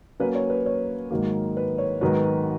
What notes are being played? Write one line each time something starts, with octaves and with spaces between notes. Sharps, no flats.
F#3 A#3 C#4 B4
C#5
B4
C#5
G#2 D#3 F#3 A#3
B4
C#5
G#2 D#3 F#3 B3 F#4 B4